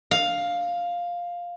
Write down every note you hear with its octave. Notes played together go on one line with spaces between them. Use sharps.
F5